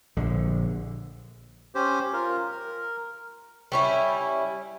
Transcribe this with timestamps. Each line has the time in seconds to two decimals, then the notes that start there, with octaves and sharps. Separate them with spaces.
0.17 A#1 D3
1.75 C#4 G4 C5
2.13 F4 A#4
2.51 A#4
3.72 G3 C#4 E4